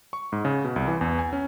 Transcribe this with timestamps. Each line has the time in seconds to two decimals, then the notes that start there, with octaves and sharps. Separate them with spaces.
0.13 C#6
0.32 G#2
0.45 C#3
0.65 B2
0.76 C2
0.88 E3
1.01 E2
1.19 G#5
1.33 C#4